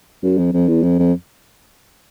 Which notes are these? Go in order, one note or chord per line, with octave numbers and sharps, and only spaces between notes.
F#2
F2
F2
E2
F2
F2